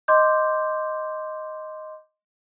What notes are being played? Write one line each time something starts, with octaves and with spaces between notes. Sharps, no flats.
D#5 C6 D6 G6